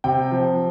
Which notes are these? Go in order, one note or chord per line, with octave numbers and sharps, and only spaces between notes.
C3 G5
F3